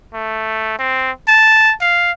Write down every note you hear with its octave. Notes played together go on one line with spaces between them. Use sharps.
A3
C4
A5
F5